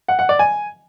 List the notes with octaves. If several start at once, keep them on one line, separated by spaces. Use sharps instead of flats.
F#5
F#5
D5
G#5